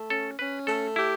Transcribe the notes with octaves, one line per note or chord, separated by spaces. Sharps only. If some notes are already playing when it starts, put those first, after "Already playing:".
Already playing: A3
C#4 A4
C#4 B4
A3 A4
E4 G4